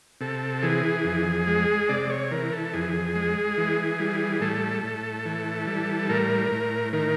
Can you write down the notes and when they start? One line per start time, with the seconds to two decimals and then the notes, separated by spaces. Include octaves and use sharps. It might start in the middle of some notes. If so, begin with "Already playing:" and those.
0.21 C3 A4
0.63 E3 G#4
1.05 F2
1.47 G#3
1.89 C3 D5
2.10 C#5
2.31 E3 A#4
2.52 A4
2.73 F2 G#4
3.15 G#3
3.58 E3
4.00 G3
4.41 A2 A4
4.83 A2
5.25 E3
5.67 G3
6.09 A2 A#4
6.51 A2
6.93 D#3 A#4